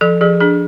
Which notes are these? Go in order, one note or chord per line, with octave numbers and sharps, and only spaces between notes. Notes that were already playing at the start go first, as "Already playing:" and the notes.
F3 A4
F3 G#4
D4 G#4